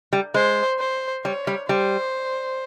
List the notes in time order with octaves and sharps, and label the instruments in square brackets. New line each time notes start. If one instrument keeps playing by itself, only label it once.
[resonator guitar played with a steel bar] G3
[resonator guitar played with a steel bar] G#3 [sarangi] C5
[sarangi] C5
[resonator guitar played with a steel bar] G3 [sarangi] C#5
[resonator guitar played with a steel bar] G3
[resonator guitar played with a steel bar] G3 [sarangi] C5